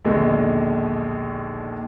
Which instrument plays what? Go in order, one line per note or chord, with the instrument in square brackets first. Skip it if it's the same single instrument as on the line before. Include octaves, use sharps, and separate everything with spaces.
[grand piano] A#1 D#2 B2 D3 G#3